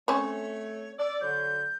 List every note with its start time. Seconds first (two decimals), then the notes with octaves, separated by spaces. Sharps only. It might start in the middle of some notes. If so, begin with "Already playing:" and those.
0.08 A3 C4 C#4 C#5
0.98 D5 E6
1.21 D3 F#3 G6